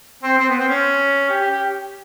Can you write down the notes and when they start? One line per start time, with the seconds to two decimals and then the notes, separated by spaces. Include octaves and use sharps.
0.23 C4
0.38 C4
0.49 B3
0.59 C4
0.69 C#4
1.30 G4
1.41 G4
1.51 G4